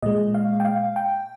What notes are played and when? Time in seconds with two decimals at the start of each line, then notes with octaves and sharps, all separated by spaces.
0.02 A#2 G#3 D#5
0.34 F5
0.60 G5
0.65 F5
0.96 G5